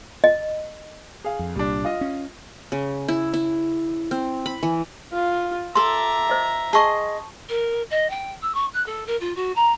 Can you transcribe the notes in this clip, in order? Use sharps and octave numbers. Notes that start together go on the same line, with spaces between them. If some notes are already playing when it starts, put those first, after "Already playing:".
D#5
G#4 F5
F2
C2 A#2 G3 D4
F4 D#5
C#4
C#3
E4
E4
C4
B5
E3
F4
A4 D5 E5 A#5 C6
C5 D#5
G#4 D#5 A5 C6 C#6
A#4
D#5
G5
E6
C#6
F#6
A4
A#4
F4
F#4
A#5